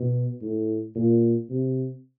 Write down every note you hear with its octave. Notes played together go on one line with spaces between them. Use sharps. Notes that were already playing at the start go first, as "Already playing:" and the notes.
Already playing: B2
A2
A#2
C3